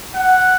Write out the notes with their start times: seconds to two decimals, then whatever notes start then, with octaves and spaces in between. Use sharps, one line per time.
0.14 F#5